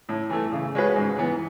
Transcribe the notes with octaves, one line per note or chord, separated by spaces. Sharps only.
A2
E3 A3
C#3
G#3 C#4 F#4 B4
G#2
E3 B3